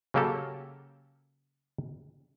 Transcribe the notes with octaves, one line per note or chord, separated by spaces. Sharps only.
C#3 F#3 A#3 G4 A4